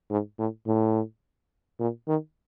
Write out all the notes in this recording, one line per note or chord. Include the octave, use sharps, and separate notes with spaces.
G#2
A2
A2
A#2
D#3